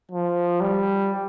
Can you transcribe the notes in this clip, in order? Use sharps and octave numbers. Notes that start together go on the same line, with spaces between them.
F3
G3